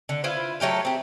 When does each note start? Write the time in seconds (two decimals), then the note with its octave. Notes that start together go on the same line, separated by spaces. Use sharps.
0.09 D3
0.24 E4 F4 B4 C5
0.60 F#3 A3 G4 F5
0.85 C4 G4